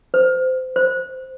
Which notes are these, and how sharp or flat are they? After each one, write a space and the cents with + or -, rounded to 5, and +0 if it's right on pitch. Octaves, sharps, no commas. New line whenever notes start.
C5 -25
C5 -5